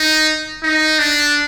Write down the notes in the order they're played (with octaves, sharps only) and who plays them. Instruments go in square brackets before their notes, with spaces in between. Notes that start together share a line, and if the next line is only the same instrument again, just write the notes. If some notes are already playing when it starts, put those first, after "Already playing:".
Already playing: [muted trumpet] D#4
D#4
D4